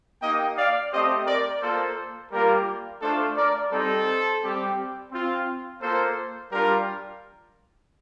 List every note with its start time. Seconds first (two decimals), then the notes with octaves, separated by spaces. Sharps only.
0.22 A#3 D#4 G4 D#5 G5
0.56 D5 F5
0.91 A3 C4 G4 C5 D#5
1.26 A#4 D5
1.61 A#3 F4 A4 C5
2.31 G3 A#3 F4 G4 A#4
3.01 A3 D4 F4 A4 C5
3.36 A#4 D5
3.71 G3 C4 D#4 A4 C5
4.42 G3 C4 G4
5.11 C4 F4
5.81 A#3 F4 A4 C5
6.51 G3 D4 F4 G4 A#4